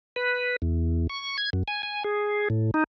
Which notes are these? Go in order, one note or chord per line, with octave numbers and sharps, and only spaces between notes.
B4
E2
C#6
G#6
F#2
G#5
G#5
G#4
A2
D#4